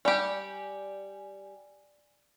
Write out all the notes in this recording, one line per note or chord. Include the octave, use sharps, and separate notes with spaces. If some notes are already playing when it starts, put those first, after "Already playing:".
G3 G4 D5 G#5